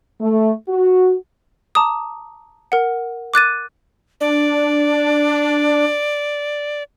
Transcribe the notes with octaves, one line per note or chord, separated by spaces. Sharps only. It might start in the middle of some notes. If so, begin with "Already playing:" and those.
A3
F#4
A5 A#5 D6 D#6
A#4 F#5
D6 F#6 A6 D#7
D4 D5